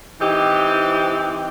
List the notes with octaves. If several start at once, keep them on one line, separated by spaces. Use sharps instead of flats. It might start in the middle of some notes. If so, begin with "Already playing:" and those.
E3 C4 D#4 G4